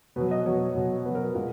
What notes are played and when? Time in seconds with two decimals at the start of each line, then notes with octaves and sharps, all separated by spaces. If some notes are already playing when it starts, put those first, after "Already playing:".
0.16 B2 F#3 B4
0.31 D#5
0.45 B2 F#3 C#5
0.75 B2 F#3
1.05 B2 F#3 B4
1.15 A#4
1.24 B4
1.35 A#2 G#3